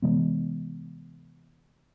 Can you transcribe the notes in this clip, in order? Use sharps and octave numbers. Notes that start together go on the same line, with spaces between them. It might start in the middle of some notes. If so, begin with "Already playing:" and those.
C3 E3 G#3 B3